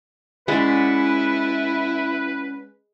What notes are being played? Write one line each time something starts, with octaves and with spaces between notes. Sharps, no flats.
G#3 C#4 E4 B4 D5 F#5